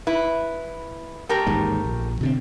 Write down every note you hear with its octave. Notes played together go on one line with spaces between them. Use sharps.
E4 B4
A3 G4 A#4
A1 D#2 G#2
A#1
B2 D3 C4